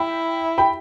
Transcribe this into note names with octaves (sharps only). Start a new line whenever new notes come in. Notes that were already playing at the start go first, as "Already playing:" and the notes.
Already playing: E4 G5 B5
G5 B5